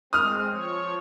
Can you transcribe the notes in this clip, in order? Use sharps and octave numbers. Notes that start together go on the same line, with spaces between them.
G#3 C4 D#6 F6
F3 C#5